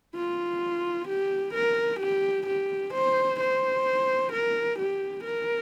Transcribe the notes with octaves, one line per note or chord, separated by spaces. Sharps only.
F4
G4
A#4
G4
G4
C5
C5
A#4
G4
A#4